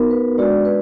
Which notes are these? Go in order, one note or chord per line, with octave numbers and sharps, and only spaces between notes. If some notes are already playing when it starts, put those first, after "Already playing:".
Already playing: B3 D#4 F#4 A#4
B4
G#3 D4 F#4 D5
B4